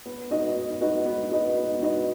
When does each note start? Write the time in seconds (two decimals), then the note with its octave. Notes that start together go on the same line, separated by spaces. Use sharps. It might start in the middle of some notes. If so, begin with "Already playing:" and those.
0.06 B3
0.30 D#4 F#4 B4 D#5
0.56 B3
0.81 D#4 F#4 B4 D#5
1.05 B3
1.30 D#4 F#4 B4 D#5
1.56 B3
1.79 D#4 F#4 B4 D#5